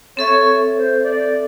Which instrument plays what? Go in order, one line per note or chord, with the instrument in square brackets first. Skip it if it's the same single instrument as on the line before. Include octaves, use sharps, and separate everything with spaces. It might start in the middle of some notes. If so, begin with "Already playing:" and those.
[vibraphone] C4 A4 E5 [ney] C#5
[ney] C5
D5